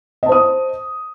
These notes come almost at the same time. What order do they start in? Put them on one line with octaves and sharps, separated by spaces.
D#5 A5 C5 D#6